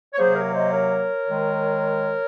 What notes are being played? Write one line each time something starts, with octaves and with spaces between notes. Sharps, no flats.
C#5
C3 F#3 A#3 G#4 C5
A#4 C#5
C5 D#5
A#4 C#5
D#3 G#3